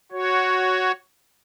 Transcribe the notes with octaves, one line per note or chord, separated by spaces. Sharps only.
F#4 C#5